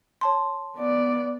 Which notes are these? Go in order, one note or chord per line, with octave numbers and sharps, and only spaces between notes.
C#5 A5 C6
B3 D5